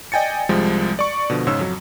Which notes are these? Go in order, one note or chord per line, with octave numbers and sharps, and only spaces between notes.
D5 D#5 G5 G#5 A6 C#7
C2 F3 G3 G#3
D5 C#6
B2 D3 F3
G#2 C#3 C#5 E6
F2 F#3